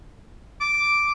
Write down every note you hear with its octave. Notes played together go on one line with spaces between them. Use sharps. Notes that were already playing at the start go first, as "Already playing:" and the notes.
D6